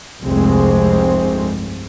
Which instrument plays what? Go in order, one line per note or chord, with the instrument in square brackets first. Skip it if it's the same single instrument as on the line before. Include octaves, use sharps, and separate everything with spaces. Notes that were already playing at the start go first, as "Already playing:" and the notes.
[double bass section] F1 C2 G2 G#3 C4